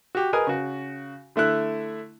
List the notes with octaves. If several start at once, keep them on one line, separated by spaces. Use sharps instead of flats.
F#4 G4
G#4 A#4 B4 D#5 G#5
C#3 F#4
D3 A3 E4 F#6